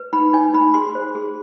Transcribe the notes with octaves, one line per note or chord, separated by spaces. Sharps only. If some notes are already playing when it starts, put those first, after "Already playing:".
Already playing: B4
D#4 B5
D#4 G#5
D#4 B5
G#4 C6
C5
G#4